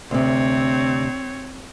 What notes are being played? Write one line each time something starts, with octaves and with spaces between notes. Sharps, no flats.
D2 C3 C4 C#5